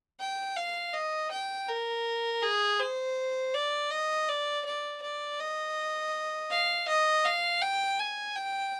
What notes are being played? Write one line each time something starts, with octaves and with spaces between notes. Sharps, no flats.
G5
F5
D#5
G5
A#4
G#4
C5
D5
D#5
D5
D5
D5
D#5
F5
D#5
F5
G5
G#5
G5